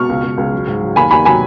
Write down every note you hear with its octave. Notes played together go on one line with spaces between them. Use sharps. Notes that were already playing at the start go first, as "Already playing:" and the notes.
Already playing: B2 C#6 F6
C#2
C#2
C#2
F#3
G#2
F#3
D#2 G#5 B5
D#2 G#5 B5
F#3 G#5 B5